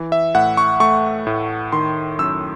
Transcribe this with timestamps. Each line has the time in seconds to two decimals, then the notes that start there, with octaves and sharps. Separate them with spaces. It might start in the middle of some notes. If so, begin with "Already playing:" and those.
Already playing: E3
0.12 E5
0.35 A2 F#5
0.57 C#6
0.80 A3 C#6
1.27 A2
1.72 D#3 C6
2.18 F#2 E6